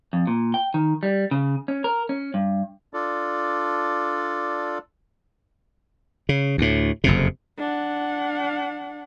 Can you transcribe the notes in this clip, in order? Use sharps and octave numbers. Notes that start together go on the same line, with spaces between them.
F2
A#2
G5
D#3
G3
C#3
C#4
A#4
C#4
G2
D4 F4 A4 D5
C#3
D2 A2
F#1 F2 C3
D4 F#5